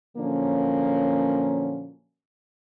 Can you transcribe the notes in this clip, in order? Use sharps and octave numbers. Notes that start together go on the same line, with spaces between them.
A#2 D3 F3 F#3 A#3 C#4